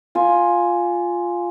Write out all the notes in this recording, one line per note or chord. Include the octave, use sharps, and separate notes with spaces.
F4 G#5